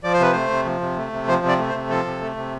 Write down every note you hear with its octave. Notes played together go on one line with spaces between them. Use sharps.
F3 D5
C5
C3 B4
A3 C5
C3
F3
C3
A3
C3
F3 C5
C3 D5
A3
C5
C3
F3 A4
C3
A3
C3